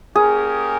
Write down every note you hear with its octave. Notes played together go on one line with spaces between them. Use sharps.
A#3 C#4 G4 G#4 A#4